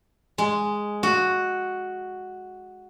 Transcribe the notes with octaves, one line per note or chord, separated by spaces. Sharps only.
G#3
F#4